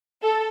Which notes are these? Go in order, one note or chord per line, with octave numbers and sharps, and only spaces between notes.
A4